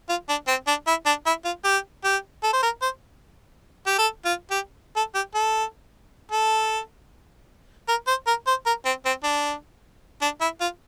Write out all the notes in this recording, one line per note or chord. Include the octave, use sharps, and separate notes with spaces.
F4
D4
C4
D4
E4
D4
E4
F4
G4
G4
A4
C5
A#4
C5
G4
A4
F4
G4
A4
G4
A4
A4
A#4
C5
A#4
C5
A#4
C4
C4
D4
D4
E4
F4